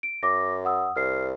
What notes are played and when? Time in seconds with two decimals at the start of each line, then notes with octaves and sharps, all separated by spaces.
0.03 D7
0.23 F#2 D6 A#6
0.65 F#5 D#6 E6
0.96 C2 F6 C7